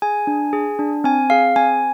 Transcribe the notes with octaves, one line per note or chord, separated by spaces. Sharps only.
G#4 G#5
D4
G#4
D4
C4 G#5
G#4 F5
C4 G#5